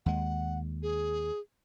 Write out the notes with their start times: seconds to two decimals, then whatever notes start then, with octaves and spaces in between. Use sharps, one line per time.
0.06 D#2 G#3 F#5
0.83 G#4